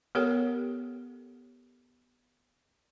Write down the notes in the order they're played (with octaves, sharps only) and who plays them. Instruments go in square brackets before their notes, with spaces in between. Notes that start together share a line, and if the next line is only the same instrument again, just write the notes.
[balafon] B3 G4 A4 A#4 C#5 G5